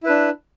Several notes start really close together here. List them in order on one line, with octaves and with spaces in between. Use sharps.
E4 B4 D4